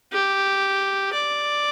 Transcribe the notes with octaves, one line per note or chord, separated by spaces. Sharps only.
G4
D5